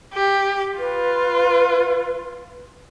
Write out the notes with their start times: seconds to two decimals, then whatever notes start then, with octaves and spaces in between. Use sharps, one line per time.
0.14 G4
0.79 F4 B4